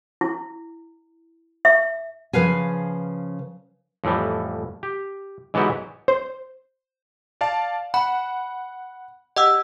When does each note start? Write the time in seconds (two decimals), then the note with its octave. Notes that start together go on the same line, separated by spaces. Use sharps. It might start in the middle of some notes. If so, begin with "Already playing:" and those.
0.21 E4
1.65 E5
2.33 C#3 F3 B4 F5 G#5
4.04 F2 A2 E3 G3
4.83 G4
5.54 G#2 E3 F#3 B3 F#4 G4
6.08 C5
7.41 D5 F5 A5
7.94 F#5 B5
9.36 G4 D#5 F#5 E6